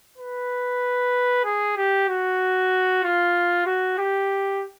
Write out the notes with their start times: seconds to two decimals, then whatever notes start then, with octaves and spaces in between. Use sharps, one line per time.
0.18 B4
1.45 G#4
1.77 G4
2.08 F#4
3.03 F4
3.66 F#4
3.98 G4